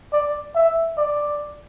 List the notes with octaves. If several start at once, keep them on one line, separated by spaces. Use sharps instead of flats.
D5
E5
D5